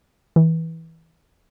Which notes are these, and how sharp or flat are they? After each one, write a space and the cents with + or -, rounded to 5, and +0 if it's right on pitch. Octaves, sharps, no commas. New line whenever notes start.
E3 -20